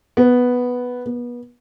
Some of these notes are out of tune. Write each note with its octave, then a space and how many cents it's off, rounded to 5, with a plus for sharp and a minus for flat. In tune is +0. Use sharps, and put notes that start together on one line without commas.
B3 +0
B3 -30